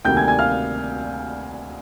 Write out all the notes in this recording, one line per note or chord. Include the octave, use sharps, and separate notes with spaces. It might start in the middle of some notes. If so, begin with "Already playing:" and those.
D2 C3 D#3 G3 A#3 G5 G6
G#5 G#6
G#5 G#6
F5 F6